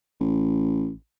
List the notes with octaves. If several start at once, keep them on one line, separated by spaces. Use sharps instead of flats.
A1